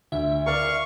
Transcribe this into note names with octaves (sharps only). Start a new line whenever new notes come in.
D2 E5
A#4 D5 F5 C#6